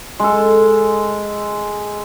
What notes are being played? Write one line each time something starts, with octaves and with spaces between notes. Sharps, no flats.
G#3 A4